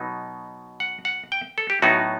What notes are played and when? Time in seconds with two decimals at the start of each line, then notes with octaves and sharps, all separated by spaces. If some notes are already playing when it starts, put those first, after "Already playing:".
Already playing: B2 F#3 B3 D#4
0.80 F#5
1.05 F#5
1.32 G5
1.58 A4
1.70 G4
1.82 A2 F#3 B3 D#4 F#4